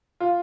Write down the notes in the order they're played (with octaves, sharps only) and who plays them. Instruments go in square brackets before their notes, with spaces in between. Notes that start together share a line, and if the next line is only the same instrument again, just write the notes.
[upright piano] F4